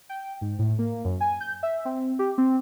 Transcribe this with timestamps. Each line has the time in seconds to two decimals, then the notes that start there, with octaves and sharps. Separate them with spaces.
0.09 G5
0.41 G#2
0.59 A2
0.79 A#3
1.05 F#2
1.20 G#5
1.40 G6
1.63 E5
1.85 C4
2.19 G4
2.38 C4